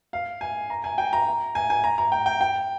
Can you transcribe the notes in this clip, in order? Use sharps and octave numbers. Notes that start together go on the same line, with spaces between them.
F5
G#5
A#5
G#5
G5
A#5
G#5
G#5
A#5
A#5
G5
G5
G5